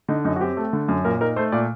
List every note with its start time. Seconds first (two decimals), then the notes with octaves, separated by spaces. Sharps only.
0.09 D3 D#4
0.25 F#2 D#4
0.36 F#4
0.41 C4 G4
0.57 A3
0.73 D3
0.88 F#2
1.04 A#2 A#4
1.21 D#4 A#4
1.36 A3 C5
1.52 A#2 D5